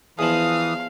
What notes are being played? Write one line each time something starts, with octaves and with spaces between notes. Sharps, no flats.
E2 E3 F3 F5 D#6